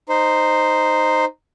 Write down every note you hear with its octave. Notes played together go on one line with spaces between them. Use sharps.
D#4 C5